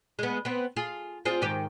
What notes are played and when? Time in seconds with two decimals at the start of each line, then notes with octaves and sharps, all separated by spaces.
0.19 G#3 B3
0.45 B3 C4
0.76 F4 G#4
1.25 C4 F4 G#4
1.42 G#2 D#3 G4